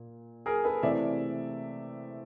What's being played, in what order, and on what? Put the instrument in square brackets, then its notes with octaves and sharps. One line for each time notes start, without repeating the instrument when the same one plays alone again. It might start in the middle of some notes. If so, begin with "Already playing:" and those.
Already playing: [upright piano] A#2
G#4 A#4
A4 B4
C3 E3 A3 C4 D5 E5